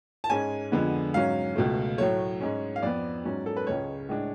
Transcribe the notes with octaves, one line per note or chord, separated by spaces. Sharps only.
A5
G#2 G#3 C#4 G#5
F2 D3 G#3 B3
G#2 F#3 C#4 F5
C#2 B2 A3
A2 F#3 A3 C#5
G#2 G#3 C#4
F5
F2 F3 B3 D5
G#2 F#3 C#4
A4
B4
C#2 C#3 G#3 C#5
A2 G#3 D4